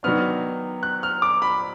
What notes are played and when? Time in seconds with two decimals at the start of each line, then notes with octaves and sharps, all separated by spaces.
0.03 D#3 F#3 B3 D4 F6
0.83 F#6
1.03 F6
1.22 D6
1.42 B5